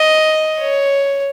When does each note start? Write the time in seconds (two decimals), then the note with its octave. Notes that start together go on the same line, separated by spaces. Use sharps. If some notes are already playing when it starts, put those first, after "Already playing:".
Already playing: D#5
0.59 C#5